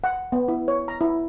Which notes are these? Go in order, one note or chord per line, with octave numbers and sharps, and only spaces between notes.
F#5
B3
E4
C#5
A#5
E4